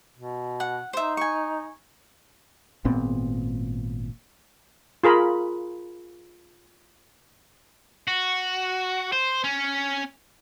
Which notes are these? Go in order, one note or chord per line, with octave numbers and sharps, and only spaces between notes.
B2
F#5
D#4 C5 E5
G#5 C#6
G#1 A#2 B3 C4
F4 G#4 A#4 B5
F#4
C5
C#4